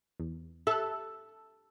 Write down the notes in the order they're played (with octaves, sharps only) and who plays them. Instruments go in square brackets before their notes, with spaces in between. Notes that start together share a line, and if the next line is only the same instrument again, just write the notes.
[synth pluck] E2
[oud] A4 [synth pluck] E5 F#6